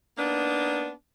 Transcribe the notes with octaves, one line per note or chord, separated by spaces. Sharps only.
A#3 B3 D4 D#4